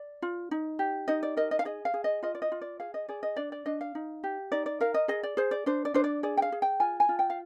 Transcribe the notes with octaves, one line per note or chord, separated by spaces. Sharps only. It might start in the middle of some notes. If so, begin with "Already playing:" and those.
Already playing: D5
F4
D#4
G4
D#4 D#5
D5
A#4 D#5
D#5
F5
G#4 D#5
F5
G#4
D#5
F4 D#5
D5
D#5
F4
D5
G#4 F5
D#5
G#4 D5
D#5
D4 D5
D5
D4 D#5
F5
D#4
G4
D#4 D5
D5
A#4 F5
D#5
G#4 D#5
D5
G#4 C5
D5
D4 C5
D5
D4 C5
D5
G#4 D5
G5
F5
G#4
G5
F4 G#5
G#5
F4
G5
F5